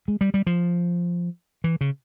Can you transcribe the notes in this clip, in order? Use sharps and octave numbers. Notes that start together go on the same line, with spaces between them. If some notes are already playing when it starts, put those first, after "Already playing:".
G#3
G3
G3
F3
E3
C#3